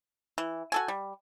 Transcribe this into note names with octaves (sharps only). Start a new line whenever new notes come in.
E3
F#4 A4 G#5
G3